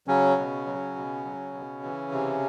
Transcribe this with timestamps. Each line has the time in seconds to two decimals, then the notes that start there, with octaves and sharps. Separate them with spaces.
0.07 C#3 F#3 C#4
0.38 B2
0.66 F#3
0.96 B2
1.25 F#3
1.54 B2
1.83 E3
2.12 C3